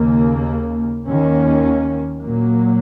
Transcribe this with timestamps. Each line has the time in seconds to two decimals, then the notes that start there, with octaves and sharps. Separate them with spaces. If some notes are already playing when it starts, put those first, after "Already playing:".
Already playing: D#2 C#3 A#3
1.06 D#2 D#3 A#3 C#4
2.21 A#2 F#3 A#3